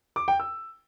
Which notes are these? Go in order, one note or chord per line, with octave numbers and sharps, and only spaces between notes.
D6
G5
E6